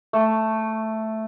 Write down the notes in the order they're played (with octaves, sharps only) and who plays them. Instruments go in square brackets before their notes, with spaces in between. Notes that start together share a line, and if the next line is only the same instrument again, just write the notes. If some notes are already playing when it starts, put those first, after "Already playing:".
[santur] A3